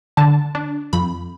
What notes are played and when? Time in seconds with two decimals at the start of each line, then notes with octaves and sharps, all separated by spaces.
0.17 D3 A5
0.55 D4
0.93 F2 B5